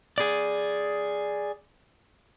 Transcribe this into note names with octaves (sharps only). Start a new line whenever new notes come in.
G#4 D5